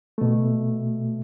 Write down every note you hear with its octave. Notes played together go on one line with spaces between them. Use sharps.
B2 A3